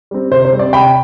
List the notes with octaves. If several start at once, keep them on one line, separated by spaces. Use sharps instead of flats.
G3 C4
C3 C5
C5
G3 C4
D5
C3 G5 B5